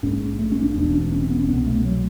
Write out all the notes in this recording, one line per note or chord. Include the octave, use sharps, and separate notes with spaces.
A#1 G#2 C#4
A3
C#4
D4
E1 E2 B2 D4
C#4
C#4
C4
B3
C#4
C2 B2 B3
A3
F#3